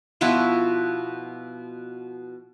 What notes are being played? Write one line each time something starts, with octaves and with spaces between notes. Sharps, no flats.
B2 F3 E4 F#4